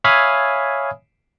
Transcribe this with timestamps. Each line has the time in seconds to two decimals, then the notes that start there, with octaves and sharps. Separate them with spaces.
0.04 C#5 E5 F5 G#5 B5 D#6